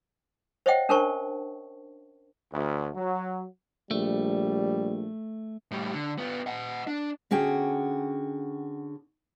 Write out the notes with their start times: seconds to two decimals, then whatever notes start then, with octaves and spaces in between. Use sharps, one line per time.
0.66 C5 C#5 D#5 E5 F#5 G5
0.89 C#4 D4 A#4 C5 A5 C#6
2.53 D2
2.95 F#3
3.91 A#1 G3 A3
5.71 A2 G3
5.94 D3
6.18 B3 F4
6.47 D#5 F#5
6.87 D4
7.31 D3 C#4 F#4 G#4 G5